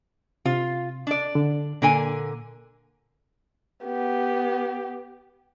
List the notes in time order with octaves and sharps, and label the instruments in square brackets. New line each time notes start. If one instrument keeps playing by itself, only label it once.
[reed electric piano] C3 [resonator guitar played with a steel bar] F4
[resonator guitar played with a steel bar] D4 D5
[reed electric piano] D3
[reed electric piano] A#2 [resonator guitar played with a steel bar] D3 A#3 G#5
[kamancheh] B3 G4